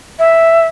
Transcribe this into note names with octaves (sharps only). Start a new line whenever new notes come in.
E5